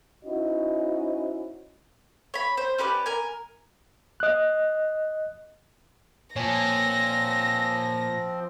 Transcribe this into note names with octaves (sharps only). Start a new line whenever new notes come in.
C#4 D#4 E4 F#4 C5 D#5
C#5 B5
C5
C#4 G4 B4 D5
A#4 G#5
D#5 F#6
A#2 F3 C4 C#5 G#5 A#6